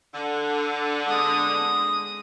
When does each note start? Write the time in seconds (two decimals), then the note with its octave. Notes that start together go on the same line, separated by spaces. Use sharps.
0.14 D3
1.06 G#3 D#6